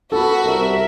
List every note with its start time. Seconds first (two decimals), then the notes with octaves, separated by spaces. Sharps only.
0.12 B3 F#4 A4 B5
0.45 C2 A#4 E5